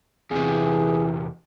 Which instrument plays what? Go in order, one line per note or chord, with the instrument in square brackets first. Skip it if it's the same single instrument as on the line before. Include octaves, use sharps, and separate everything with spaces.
[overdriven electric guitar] E2 C3 [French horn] E3 [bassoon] G#4